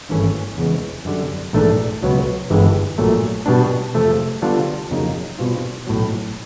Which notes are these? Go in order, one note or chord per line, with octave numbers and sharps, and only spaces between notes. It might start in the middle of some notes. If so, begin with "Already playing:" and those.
G#1 G2 E3 A3 C#4
E2 C#3 E3 G#3
F#2 D3 G3
A#1 G#2 E3 A3 D4
C#2 B2 F#3 B3
G1 G2 E3 G#3
A#1 A#2 F#3 A3
B2 G3 B3 D4
F2 C3 F3 A3
D3 G3 B3 D4 F4
F2 C#3 F#3 A#3 D#4
B2 G3 C4 F4
B1 A2 F#3